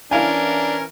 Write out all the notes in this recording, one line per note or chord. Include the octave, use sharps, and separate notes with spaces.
E3 C#4 D4 E4 A#4 F5 G#5